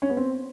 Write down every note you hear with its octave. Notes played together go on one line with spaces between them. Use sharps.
C#4
B3
C4